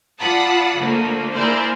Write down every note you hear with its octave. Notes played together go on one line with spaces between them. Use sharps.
F4 D5 F#5 A5 B5 D#6
D3 F3 A3 A#3
A#3 E4 G#4 A#4 C5 D5